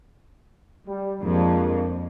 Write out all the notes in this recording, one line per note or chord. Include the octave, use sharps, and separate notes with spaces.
G3
F2 G#3 A#3 D4